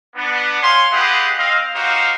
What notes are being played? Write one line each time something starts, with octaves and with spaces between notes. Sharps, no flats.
B3 D4
C#5 F5 G#5 C6
F4 G4 G#4 B4 D#5 F#5
C4 D#5 F5
D#4 F#4 G4 C5 F5